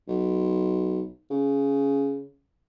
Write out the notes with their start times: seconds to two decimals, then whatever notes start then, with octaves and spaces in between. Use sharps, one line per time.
0.08 B1
1.30 C#3